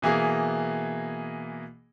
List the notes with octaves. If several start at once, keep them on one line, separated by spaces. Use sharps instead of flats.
B2 E3 A#3 G#4